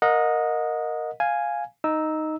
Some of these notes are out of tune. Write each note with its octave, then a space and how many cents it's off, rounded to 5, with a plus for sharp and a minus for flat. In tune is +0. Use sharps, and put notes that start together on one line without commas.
A#4 +0 D#5 +0 F#5 -35
F5 +0 G#5 +0
D#4 +0 E6 -15